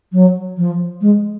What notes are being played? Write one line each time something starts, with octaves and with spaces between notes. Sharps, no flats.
F#3
F3
G#3